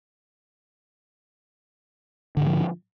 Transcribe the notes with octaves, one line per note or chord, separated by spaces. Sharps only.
G#2 D3 E3 F3